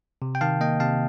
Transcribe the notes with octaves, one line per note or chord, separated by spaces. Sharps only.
C3
G5
D#3 F5 A5
A#3 D#5 G5
C3 F5 A5